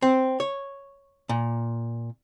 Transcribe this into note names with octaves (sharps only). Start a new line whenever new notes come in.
C4
C#5
A#2